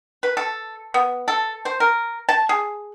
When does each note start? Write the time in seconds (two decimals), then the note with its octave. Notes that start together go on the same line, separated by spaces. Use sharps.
0.23 B4
0.37 A4
0.94 B3
1.28 A4
1.65 C5
1.80 A#4
2.29 A5
2.49 G#4